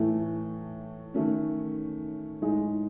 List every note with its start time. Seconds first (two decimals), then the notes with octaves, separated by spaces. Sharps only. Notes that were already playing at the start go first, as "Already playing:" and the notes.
Already playing: A2 E3 A3
1.14 D#3 A3 C#4
2.42 A2 G#3 D#4 G#4